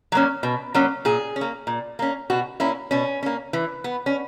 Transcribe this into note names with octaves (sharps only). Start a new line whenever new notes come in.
F#3 A#3 C#4
B2
F#3 A#3 C#4
A#2 G#4
C#4
A#3
A#2
A#3 C#4
B2 F#4
A#3 C#4 E4
B2 C#4
A#3 C#4
E3
B3
C#4